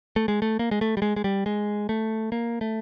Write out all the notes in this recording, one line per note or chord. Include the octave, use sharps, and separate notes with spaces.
A3
G#3
A3
A#3
G#3
A3
G3
G#3
G#3
G3
G#3
A3
A#3
A3